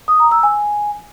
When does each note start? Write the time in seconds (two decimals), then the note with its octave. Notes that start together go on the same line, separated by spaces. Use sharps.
0.08 D#6
0.20 A#5
0.31 E6
0.43 G#5